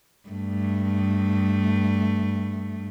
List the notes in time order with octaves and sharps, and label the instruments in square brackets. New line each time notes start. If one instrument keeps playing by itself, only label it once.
[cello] G2 A3